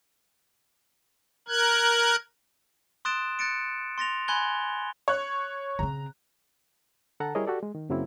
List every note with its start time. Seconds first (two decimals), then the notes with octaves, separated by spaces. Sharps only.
1.48 A#4 F#6 G#6
3.05 C6 D#6 F#6 A6 D7 E7
3.39 F#6 A6 C#7 D7
3.98 C6 A6 A#6 F7
4.28 G#5 B5 C6 F#6 G#6 G7
5.08 C#5 C#6 F#6
5.79 C#3 C4 A#5
7.20 D3 A4 F#5 A5 A#5
7.35 G3 E4 G#4 A#4 C#5 D#5
7.47 F#4 G4 A4 D5
7.63 G#3
7.75 D#3
7.89 F#2 C#3 F#3 A#3 C4 E4